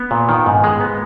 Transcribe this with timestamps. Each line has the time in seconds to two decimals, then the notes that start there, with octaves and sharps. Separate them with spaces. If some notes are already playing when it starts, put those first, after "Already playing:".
Already playing: B3
0.11 A#2
0.29 D#3
0.46 G#2
0.64 G#3
0.81 B3